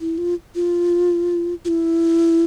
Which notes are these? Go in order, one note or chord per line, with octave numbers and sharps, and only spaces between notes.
E4
F4
F4
F4
E4